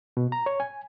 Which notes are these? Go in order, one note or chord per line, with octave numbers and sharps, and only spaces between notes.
B2
A#5
C#5
G#5